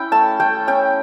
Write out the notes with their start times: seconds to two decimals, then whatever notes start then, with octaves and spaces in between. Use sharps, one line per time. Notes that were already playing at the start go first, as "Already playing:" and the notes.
Already playing: C#4 E4 G5
0.12 A3 A5
0.40 A3 G5
0.68 C#4 G5